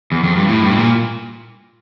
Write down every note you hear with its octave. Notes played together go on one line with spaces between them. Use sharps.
E2
F2
G2
A2
G2
A2
A#2